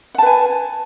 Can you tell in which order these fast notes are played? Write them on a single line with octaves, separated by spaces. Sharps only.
F#5 A5 B4 G#5